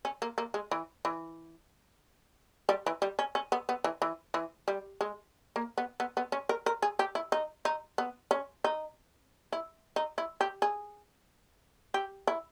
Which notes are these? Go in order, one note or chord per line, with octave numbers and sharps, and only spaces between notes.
C#4
A#3
A#3
G#3
E3
E3
G3
E3
G3
C#4
C#4
B3
B3
E3
E3
E3
G3
G#3
A#3
B3
B3
B3
C#4
A#4
A#4
G#4
G4
E4
D#4
D#4
B3
C#4
D#4
E4
D#4
E4
G4
G#4
G4
E4